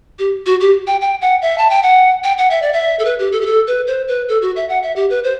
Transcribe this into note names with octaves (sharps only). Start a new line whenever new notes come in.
G4
F#4
G4
G5
G5
F#5
E5
A5
G5
F#5
G5
F#5
E5
D5
E5
A4
B4
G4
A4
G4
A4
B4
C5
B4
A4
F#4
E5
F#5
E5
G4
B4
C5